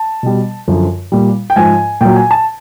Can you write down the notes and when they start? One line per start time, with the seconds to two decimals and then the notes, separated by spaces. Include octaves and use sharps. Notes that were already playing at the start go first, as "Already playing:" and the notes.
Already playing: A5
0.23 B2 G3
0.67 F#2 D3 F3
1.12 A#2 G3
1.50 G5
1.56 G#2 F3 G#5
2.01 A#2 F#3 G5
2.16 G#5
2.31 A5